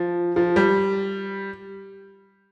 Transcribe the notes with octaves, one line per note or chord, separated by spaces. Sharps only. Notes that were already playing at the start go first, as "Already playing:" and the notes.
Already playing: F3
F3
G3